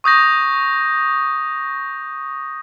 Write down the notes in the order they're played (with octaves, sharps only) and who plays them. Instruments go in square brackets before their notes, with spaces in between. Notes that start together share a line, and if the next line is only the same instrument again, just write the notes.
[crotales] C#6 D#6 G6 A#6